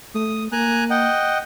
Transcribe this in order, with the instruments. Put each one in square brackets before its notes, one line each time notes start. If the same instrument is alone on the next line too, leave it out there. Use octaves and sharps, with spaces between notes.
[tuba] A3 [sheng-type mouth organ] D#6
[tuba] A#3 [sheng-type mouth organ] G#5 A#5 F#6
[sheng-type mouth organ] D#5 F#5 G5